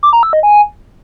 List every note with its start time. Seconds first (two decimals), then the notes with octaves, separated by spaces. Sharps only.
0.03 D6
0.13 A#5
0.23 E6
0.33 D#5
0.43 G#5